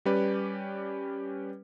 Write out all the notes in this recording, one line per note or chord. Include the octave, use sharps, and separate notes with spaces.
G3 C#4 G4 B4 D5